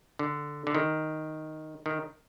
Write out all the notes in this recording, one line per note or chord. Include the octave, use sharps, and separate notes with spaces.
D3
D3
D#3
D#3